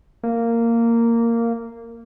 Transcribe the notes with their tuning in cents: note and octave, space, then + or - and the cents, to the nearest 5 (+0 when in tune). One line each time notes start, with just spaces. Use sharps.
A#3 -10